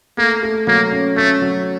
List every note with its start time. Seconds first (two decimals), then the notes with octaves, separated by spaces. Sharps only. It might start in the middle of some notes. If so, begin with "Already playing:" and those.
0.18 A3 A#3
0.43 A3
0.67 F#3 A#3
0.92 C#4
1.17 A3 C#4
1.42 F#3